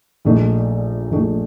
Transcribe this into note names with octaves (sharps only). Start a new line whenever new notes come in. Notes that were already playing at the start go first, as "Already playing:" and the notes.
A#1 A#2 A3 D#4
A#1 A#2 A3 D#4